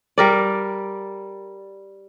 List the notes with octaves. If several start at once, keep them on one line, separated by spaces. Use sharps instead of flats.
G3 A#4 D5